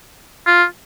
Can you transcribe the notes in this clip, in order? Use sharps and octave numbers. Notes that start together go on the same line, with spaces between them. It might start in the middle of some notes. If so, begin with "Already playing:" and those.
F4